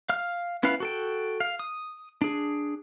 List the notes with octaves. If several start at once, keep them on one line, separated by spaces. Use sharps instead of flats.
F5 F6
B3 C#4 E4 B4 F5
F#4 A4 G5
F5
D#6
D4 G#4